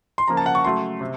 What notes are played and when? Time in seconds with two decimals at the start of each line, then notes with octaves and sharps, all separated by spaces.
0.18 C6
0.28 C#3 F3 A#3 A#5
0.37 A5
0.46 F#5
0.55 C#6
0.64 C#3 F#3 A3 C6
1.01 C3